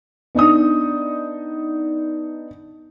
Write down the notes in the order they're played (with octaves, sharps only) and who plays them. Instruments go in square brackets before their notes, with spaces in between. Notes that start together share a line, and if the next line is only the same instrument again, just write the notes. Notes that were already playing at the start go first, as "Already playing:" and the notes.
[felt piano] B3 D4 D#4 D#6